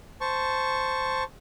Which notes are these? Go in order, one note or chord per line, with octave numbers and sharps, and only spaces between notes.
C5 A5 C#6